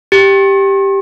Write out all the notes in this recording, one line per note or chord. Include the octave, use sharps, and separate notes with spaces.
G4